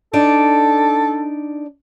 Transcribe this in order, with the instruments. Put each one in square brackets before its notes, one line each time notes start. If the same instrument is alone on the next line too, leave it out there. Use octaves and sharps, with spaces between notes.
[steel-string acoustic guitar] D4 D#4 D5 [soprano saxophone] A4